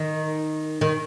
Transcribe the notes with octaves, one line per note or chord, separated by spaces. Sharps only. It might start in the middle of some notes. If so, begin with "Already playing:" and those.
Already playing: D#3
D#3